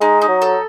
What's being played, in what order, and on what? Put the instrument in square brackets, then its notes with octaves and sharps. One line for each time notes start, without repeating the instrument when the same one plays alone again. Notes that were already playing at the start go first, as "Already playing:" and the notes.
[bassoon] G#3 [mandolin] D#4
[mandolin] D#4
[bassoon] F#3
[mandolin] A4